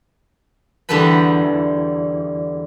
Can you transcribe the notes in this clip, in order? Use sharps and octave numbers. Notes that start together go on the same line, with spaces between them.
E2 D3 G3 A4 B4 B5